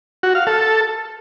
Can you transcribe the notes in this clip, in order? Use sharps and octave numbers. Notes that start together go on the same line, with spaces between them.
F#4
F5
A4